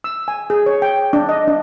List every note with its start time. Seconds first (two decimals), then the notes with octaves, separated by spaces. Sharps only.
0.04 E6
0.28 G#5
0.50 G#4
0.66 C#5
0.82 G5
1.13 D4
1.29 D#5
1.48 D4